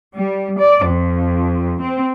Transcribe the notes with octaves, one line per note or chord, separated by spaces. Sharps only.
G3
D5
F2
C4